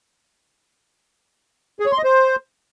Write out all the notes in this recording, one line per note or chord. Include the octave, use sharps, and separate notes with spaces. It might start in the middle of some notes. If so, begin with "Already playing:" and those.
G#4
C#5
C6
D#5
C5